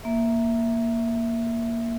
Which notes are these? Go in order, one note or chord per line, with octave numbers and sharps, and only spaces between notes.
A#3 E5